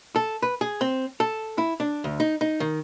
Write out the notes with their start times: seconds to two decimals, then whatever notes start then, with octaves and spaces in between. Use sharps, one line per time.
0.16 A4
0.42 B4
0.61 G#4
0.81 C4
1.20 A4
1.58 E4
1.80 D4
2.04 D2
2.20 D#4
2.41 D#4
2.60 D#3